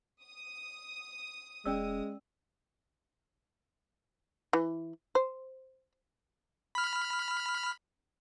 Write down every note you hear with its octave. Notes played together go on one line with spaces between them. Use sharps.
D#6
E1 G#3 C#4 D5 E6
E3
C5
B5 F6